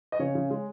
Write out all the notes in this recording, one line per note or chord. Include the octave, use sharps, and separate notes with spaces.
D#5
C#3 C#5
C#3
G#3